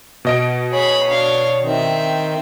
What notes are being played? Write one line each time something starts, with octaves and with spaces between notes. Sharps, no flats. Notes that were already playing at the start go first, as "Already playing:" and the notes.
B2 D#5 D7
G#4 C#5 B5
D4 F5
D#3 C4 E5